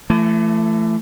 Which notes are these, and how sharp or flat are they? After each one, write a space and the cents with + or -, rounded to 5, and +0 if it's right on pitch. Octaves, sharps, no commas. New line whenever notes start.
E3 +35 A3 +0